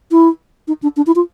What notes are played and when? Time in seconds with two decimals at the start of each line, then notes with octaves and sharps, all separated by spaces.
0.11 E4
0.67 D#4
0.82 D4
0.96 D4
1.06 E4
1.15 F4